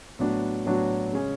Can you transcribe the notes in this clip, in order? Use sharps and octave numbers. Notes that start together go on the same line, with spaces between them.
A2 F#3 B3 D4 F#4
A2 F#3 B3 D4 F#4
C#3 G#3 C#4 G#4